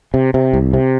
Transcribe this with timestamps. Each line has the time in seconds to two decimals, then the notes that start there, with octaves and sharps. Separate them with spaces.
0.14 C3
0.34 C3
0.54 C2
0.74 C3